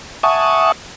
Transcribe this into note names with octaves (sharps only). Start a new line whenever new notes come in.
E5 F#5 G#5 A5 C#6 D#6